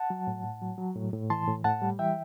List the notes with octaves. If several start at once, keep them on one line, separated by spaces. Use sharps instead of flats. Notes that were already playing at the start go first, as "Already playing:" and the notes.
Already playing: F#5 A5
F#3
A2
A2
F#3
F#3
A2
A2
E3 A5 C6
A2
A2 F#5 A5
G3
E3 E5 G5